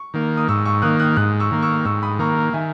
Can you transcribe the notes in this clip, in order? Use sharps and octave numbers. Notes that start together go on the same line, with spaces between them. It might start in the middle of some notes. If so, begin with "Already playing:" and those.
Already playing: C#6
D#3 A#3
D#6
G#2 C#6 E6
C#6 E6
D#3 A#3 D#6 F#6
D#6 F#6
G#2 D#6 F#6
C#6 E6
D#3 A#3
C#6 E6
G#2 C#6 E6
B5 D#6
D#3 A#3 A#5 C#6
D#3 E5 G#5